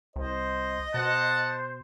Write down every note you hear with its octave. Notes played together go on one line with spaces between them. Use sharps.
C2 C5 D#5
B2 C5 F#5 A5